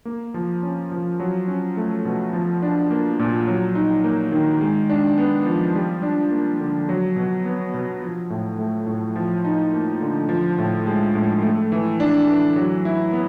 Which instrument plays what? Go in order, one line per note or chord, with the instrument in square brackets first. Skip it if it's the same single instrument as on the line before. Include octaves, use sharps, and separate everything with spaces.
[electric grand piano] A#3
F3
C#4
F3
F#3
C#4
A3
B2
F3
D4
A#3
A#2
F#3
D#4
A#3
D#3
G#3
D4
B3
F3
G3
D4
A#3
D3
F#3
B2
B3
B2
F3
A2
A3
A2
F3
D#4
A#3
D3
F3
A2
G#3
A2
A3
E3
D4
E3
F#3
E4
B3